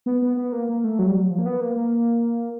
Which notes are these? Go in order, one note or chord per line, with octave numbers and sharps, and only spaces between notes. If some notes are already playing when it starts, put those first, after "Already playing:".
B3
B3
B3
A#3
A#3
A3
F#3
G3
F#3
F3
A#3
B3
A#3
A#3